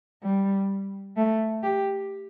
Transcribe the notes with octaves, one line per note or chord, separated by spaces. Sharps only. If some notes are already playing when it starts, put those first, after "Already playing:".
G3
A3
G4